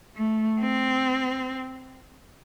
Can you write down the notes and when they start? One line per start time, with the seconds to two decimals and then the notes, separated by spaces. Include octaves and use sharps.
0.16 A3
0.61 C4